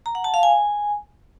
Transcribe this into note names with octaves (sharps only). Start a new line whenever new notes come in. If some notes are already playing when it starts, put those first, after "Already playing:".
A#5
F#5
A5
F5
G#5